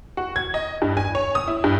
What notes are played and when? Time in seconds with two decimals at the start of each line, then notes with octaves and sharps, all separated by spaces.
0.17 F#4
0.36 G#6
0.54 D#5
0.82 G2
0.97 G#5
1.15 C#5
1.35 D#6
1.48 E4
1.64 G2